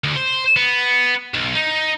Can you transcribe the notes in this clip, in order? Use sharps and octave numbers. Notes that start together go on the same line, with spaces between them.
D2
C5
B3
B1
D#4